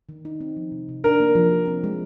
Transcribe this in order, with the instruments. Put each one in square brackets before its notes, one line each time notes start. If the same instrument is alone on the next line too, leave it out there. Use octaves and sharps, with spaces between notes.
[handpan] D#3
D#4
C4
F3
C3
C3
[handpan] D4 [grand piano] A#4
[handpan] A#3
F3
G4
C4
G#3